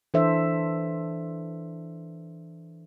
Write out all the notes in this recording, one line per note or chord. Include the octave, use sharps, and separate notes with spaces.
E3 D4 A4 C5 E5